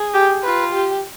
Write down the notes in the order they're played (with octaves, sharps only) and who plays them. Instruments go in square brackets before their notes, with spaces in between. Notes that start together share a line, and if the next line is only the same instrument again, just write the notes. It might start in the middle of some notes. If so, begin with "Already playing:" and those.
Already playing: [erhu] G#4
[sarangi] G4
[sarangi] F4 [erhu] B4
[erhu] G4